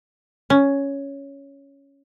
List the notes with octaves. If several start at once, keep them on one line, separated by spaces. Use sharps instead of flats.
C#4